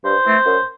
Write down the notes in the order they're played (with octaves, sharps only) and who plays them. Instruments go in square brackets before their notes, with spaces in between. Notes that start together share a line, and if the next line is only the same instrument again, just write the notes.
[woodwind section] G2 C5
E3 A3 C4
F#2